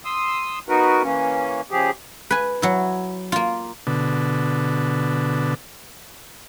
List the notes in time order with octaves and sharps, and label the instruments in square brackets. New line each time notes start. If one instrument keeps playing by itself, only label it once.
[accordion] C6 D#6 E6
B3 D#4 F#4 A#4 B4
E3 A#3 C#4
C#3 F3 G4 G#4
[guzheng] B4 G#5
F#3 E4
A#3 F4
[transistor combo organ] B2 D3